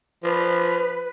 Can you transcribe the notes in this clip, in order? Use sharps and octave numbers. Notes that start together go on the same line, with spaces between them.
F3 B4